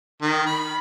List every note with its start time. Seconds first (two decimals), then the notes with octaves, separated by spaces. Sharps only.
0.22 D#3
0.46 B5